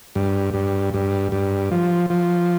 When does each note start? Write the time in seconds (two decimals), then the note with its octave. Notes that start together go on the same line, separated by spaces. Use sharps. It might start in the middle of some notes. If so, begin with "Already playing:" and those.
0.15 G2
0.54 G2
0.94 G2
1.32 G2
1.71 F3
2.10 F3